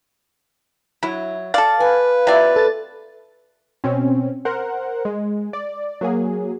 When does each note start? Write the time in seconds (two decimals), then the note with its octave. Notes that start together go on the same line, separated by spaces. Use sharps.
1.03 F#3 E4
1.54 A4 D5 F5
1.80 B4 G#5
2.27 C3 E4 F4 D5 E5
2.56 A4 A6
3.84 B2 C4 C#4
4.45 A#4 C5 F#5
5.05 G#3
5.53 D5
6.01 F#3 A#3 G#4